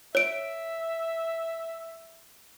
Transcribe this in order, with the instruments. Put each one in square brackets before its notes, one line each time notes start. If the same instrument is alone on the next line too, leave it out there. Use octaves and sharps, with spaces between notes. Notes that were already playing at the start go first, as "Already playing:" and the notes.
[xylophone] C#5 D7 [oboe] E5